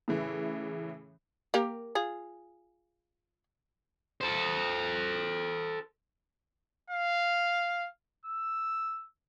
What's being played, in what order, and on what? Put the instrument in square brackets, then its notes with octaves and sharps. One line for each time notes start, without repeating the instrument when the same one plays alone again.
[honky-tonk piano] A2 C#3 E3
[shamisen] A#3 G4 A#4
F4 G#4
[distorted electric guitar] A4 C5
[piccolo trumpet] F5
E6